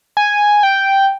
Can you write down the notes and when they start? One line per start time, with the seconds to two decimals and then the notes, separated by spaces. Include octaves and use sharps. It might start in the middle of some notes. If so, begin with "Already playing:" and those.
0.17 G#5
0.63 G5